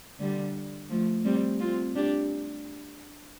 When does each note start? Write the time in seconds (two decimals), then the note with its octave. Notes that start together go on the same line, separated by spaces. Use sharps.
0.20 D3 G3
0.90 F3 A3
1.25 G3 C4
1.60 C4 F4
1.95 D4 G4